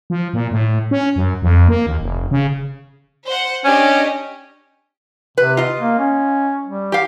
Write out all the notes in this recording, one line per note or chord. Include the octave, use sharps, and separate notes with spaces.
F3
A#2
A2
C#4
F#2
F2
A#3
D#2
F1
C#3
C5 F#5
C#4 D4 G4 D#5
C3 B4
F4 D#5
A#3
C#4
G3
G4 F5